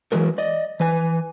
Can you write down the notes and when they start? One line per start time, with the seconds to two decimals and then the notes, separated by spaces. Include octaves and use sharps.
0.12 E3 F#3 G#3 A#4
0.38 D5 D#5
0.80 E3 B4 G#5